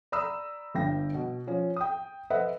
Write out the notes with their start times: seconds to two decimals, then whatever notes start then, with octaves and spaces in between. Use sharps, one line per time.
0.12 D5 A#5 B5 D#6 E6
0.74 G1 G2 G5 A#6
1.14 B2
1.47 F3 C#4
1.77 G5 D#6
2.30 A4 B4 C5 D#5 E5 F#5